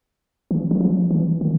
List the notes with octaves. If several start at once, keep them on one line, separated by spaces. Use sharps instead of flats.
E3
F#3
F3
E3
D#3